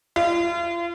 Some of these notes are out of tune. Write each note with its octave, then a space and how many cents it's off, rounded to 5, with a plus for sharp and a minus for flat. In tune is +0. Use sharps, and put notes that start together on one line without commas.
F4 -35